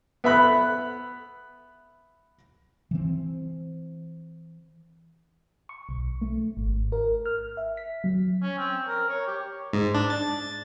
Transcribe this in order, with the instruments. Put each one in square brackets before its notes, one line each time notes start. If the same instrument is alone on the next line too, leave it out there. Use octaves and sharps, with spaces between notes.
[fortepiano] B3 E5 B5 F#6
[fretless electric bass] E3 C4
[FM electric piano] C#6
B1
A3
G#1
A#4
F6
E5
B6
F#3
[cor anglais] C#4
C4
A#4
C#5
G4
[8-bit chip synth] G#2
D4
A6